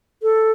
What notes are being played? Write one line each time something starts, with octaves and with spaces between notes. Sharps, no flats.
A4